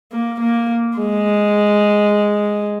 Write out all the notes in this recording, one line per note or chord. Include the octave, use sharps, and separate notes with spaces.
A#3
A#3
G#3